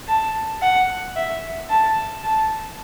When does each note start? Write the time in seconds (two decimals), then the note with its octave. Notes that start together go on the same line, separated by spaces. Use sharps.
0.08 A5
0.62 F#5
1.16 E5
1.70 A5
2.24 A5